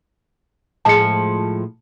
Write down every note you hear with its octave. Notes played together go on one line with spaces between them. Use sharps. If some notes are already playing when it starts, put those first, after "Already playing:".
A2 F3 G#3 A5 C#7